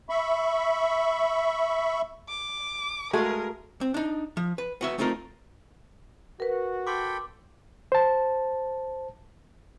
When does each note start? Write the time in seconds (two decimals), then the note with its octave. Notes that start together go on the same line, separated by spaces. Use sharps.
0.09 E5 B5 C#6
2.29 D6
3.13 G#3 A3 F#4 G#4 A#4 F5
3.81 C4
3.94 D4 D#4
4.37 F3
4.58 B4
4.81 B3 F#4 E5
4.98 A3 C4 D#4 F4 A#4
6.40 F#4 A#4 B4
6.87 A4 G5 B5 C6 D6
7.92 C5 A5